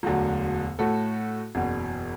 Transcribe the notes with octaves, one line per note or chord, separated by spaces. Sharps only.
E1 D2 D3 F#3
A2 A3 F#4 A4
F#1 E2 B2